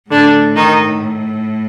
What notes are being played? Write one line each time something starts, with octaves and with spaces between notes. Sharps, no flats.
A2 D3 D4
D#3 D#4